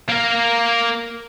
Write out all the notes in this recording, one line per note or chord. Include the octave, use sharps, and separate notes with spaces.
A#3 A#4